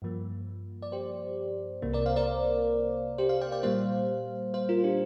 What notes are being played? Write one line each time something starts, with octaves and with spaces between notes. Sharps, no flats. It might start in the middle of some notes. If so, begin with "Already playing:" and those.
G2 F3 A#3
D5
G4 C5
C2 C3 A#3
A#4 D5
C5 F5
A#4 D5
G4 C5
C5 F5
D5 G5
D5 G5
A#2 G3 A#3 C5 F5
C5 F5
F4 A#4
D4 G4